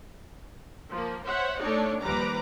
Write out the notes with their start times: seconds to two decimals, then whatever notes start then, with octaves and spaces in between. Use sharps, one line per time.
0.89 F3 A#3
1.25 C5 C#5 E5 F#5
1.60 A3 D4 D#4 C#5 D5
2.01 D#2 F3 G3 B4 A#5 D6